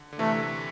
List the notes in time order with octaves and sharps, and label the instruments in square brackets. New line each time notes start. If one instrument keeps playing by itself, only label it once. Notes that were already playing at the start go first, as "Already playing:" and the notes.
Already playing: [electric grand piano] D3
D3
[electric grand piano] C3 E3 [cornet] A3